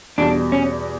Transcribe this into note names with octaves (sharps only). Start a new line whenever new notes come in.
E2 B2 G3 D4
C#4